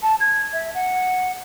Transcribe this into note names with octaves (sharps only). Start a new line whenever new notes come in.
A5
G#6
E5
F#5